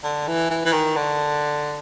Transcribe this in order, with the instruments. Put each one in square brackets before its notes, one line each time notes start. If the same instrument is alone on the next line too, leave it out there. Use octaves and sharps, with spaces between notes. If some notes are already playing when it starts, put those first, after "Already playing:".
[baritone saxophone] D3
E3
E3
E3
D#3
D3